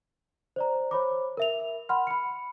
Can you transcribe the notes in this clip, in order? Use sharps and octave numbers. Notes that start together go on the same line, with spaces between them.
C5 D5 A#5
C5 C#5 B5 D6
A#4 E5 F7
F#5 B5 C6 F6
B5 C#7